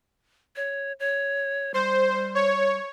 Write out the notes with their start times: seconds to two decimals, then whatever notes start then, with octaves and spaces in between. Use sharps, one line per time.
0.56 C#5
1.00 C#5
1.74 G3 C5
2.35 C#5